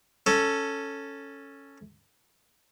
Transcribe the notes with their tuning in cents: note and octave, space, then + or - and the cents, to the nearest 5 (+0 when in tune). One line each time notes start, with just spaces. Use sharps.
C#4 +0 A4 +10